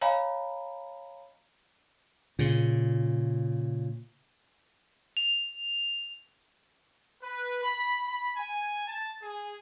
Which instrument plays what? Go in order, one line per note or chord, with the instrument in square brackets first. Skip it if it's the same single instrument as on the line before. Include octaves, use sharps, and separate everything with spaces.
[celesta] C#5 D#5 F5 G#5 A#5 B5
[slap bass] A#2 C#3
[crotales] F7
[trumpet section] B4
B5
B5
G#5
A5
G#4